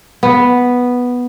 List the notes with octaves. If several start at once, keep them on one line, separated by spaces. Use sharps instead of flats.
B3